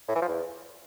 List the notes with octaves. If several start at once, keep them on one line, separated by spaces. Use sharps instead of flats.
A2
E3
F3
E2